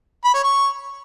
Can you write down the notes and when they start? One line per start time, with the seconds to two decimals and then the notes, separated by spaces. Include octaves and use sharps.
0.24 B5
0.34 C#5
0.43 C#6